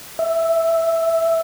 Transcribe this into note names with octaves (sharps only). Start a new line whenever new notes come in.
E5